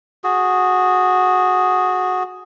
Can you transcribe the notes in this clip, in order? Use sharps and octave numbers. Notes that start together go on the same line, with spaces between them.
F#4 G#4